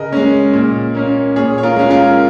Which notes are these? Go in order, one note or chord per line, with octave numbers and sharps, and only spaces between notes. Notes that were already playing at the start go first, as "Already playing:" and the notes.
Already playing: C#3 A#4 D#5
G#3 C#4
A#2
A#3 C#4
A#2 G#4 C#5
C#5
F4 A#4
G#3 C#4
F4 A#4